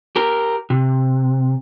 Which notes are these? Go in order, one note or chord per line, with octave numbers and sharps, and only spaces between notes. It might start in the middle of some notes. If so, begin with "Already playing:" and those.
G4 A#4
C3